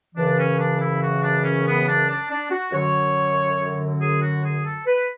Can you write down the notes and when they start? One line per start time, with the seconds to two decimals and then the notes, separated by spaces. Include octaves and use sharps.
0.15 F#2 C#3 E3 D4
0.38 C#4
0.58 D4
0.80 E4
1.01 F#4
1.22 D4
1.44 C#4
1.66 B3
1.86 D4
2.09 D4
2.30 D4
2.51 F#4
2.72 F#2 D3 F#3 C#5
4.01 G#4
4.21 F#4
4.43 G#4
4.64 A4
4.86 B4